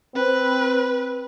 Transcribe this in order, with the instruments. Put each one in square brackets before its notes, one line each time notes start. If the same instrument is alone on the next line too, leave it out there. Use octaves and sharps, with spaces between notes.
[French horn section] C4 [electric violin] B4